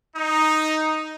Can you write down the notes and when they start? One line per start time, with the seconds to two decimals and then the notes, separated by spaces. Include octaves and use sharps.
0.16 D#4